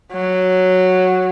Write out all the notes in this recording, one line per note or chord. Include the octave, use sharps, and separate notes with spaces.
F#3